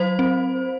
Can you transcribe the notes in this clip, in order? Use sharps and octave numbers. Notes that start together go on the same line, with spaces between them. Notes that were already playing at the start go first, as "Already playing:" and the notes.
Already playing: F#3 C5
C4